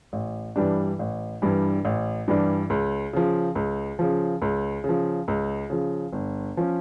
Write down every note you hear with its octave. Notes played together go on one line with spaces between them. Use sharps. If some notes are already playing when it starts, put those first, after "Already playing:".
A1
G2 E3 G3 D4
A1
G2 E3 G3 D4
A1
G2 E3 G3 D4
C#2
C#3 F3
C#2
C#3 F3
C#2
C#3 F3
C#2
C#3 F3
G1
F3 C#4